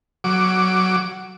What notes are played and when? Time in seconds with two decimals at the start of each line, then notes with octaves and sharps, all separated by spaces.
0.24 F#3 D6